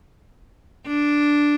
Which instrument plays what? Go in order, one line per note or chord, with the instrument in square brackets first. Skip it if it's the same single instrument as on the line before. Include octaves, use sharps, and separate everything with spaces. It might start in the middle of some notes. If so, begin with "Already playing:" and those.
[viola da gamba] D4